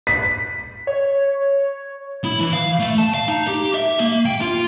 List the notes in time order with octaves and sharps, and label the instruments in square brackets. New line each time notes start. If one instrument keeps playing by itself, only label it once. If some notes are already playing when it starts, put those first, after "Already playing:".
[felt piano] B6
[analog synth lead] C#5
[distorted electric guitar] E4
E3
F5
A3
A5
F5
D#4
G4
E5
A#3
G5
F4